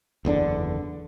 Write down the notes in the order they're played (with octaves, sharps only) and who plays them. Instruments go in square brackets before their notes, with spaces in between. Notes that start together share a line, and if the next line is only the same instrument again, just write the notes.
[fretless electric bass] F#1 E2 D3 D4